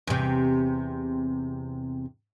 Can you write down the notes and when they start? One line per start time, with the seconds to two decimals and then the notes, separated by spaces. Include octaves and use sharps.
0.07 E2 C3